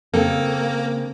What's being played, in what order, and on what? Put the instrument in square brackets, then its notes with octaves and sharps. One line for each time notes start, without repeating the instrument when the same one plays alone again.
[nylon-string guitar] C#3 C4 A4 [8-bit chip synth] A#3